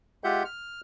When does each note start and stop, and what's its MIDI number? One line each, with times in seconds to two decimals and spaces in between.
0.24 0.43 56
0.24 0.43 65
0.24 0.43 67
0.24 0.43 76
0.24 0.43 78
0.24 0.43 91
0.45 0.81 89